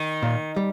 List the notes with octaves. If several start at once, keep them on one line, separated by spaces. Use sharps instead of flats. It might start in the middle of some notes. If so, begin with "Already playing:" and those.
Already playing: D#3
A#2
G3